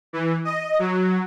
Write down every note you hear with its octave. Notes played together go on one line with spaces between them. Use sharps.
E3
D#5
F#3